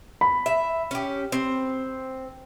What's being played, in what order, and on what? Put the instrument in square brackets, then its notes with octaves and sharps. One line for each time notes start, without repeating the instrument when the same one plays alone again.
[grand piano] B5
[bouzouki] E5
C#4 G4
C4